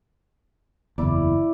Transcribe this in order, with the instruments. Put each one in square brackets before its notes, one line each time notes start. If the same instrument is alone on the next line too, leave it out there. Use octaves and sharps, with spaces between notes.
[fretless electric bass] F#1 E2 [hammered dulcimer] E4 D5